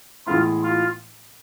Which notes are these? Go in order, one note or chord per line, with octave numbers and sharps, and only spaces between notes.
A2 E3 G#3 B3 E4 F4
F4